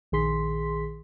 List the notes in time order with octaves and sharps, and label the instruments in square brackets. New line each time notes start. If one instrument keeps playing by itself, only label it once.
[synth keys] A#1 D#3 G#4 C6 B6